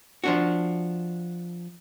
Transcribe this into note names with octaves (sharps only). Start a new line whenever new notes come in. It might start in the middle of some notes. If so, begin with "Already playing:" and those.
F3 D4 F#4